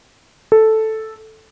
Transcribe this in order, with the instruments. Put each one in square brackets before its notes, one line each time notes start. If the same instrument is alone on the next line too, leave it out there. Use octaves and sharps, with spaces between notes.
[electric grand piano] A4